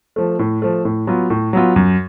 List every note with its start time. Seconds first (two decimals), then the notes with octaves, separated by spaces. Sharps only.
0.16 F3 A3
0.39 A2
0.62 F3 A3
0.85 A2
1.07 F#3 B3 F4
1.30 A2
1.53 F#3 B3 F4
1.76 F#2